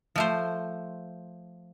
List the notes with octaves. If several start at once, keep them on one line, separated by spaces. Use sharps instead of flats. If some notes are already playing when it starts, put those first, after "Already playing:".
F3 A3 C5